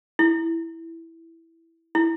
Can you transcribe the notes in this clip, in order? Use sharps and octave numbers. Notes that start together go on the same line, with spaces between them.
E4
E4